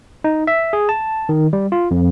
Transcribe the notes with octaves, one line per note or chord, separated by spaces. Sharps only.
D#4
E5
G#4
A5
D#3
G3
F4
F2